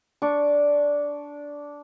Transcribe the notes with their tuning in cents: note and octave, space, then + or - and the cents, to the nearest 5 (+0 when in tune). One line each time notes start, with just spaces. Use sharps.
D4 -10 C#6 +0